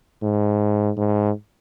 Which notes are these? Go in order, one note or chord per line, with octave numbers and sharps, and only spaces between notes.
G#2
G#2